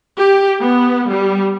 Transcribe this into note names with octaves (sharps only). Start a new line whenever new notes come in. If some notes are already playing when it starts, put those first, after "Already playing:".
G4
B3
G3